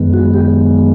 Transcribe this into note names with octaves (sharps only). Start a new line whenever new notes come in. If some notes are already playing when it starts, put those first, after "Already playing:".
Already playing: F#2 D#3 G#3 B3
F#4
G4